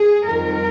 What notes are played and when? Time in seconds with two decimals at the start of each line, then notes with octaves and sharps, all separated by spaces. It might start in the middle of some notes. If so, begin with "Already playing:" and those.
Already playing: G#4
0.25 F2 D#3 G3 A#4